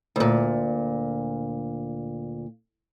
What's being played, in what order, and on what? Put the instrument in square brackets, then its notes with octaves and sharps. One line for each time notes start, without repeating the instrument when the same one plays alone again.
[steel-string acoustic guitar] D2 A#2